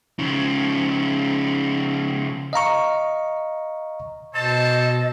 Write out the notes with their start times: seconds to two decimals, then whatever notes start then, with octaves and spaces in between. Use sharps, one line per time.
0.19 C#3 F3
2.53 D#5 F5 A#5 C#6
4.35 B2 A4 C5 D#5 A5